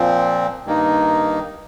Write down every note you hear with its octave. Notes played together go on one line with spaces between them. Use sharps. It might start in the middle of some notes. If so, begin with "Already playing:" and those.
Already playing: A#2 F3 C4
G2 D#3 A#3 D#4